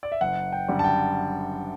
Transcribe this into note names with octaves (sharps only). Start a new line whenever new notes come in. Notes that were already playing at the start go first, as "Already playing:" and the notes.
D5
E5
F#1 F#5
G5
F#2 D3 G3
A5
G5